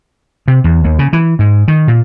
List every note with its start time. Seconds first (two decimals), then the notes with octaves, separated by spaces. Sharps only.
0.48 C3
0.64 E2
0.84 D#2
0.99 C#3
1.13 E3
1.39 G#2
1.68 D#3
1.88 A#2